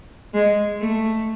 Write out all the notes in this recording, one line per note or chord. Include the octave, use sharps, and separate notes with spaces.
G#3
A3